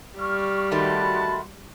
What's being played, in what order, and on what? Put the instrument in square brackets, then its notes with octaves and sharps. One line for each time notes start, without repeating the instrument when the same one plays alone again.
[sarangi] G3 [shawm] F5 [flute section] C#6 F6
[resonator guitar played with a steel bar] D#3 A3 [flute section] F#4 B5 C6 [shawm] A5